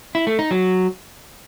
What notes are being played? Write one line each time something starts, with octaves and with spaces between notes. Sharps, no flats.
E4
A3
D#4
F#3